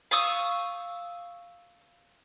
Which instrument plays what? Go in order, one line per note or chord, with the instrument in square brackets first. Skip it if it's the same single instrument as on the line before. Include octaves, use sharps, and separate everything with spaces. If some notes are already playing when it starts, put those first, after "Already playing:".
[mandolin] F5 C#6 D#6 E6